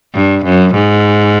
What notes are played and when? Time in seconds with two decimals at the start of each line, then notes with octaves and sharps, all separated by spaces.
0.15 G2
0.45 F#2
0.74 G#2